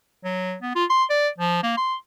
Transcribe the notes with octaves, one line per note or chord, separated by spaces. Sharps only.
F#3
B3
F4
C6
D5
F3
A#3
C6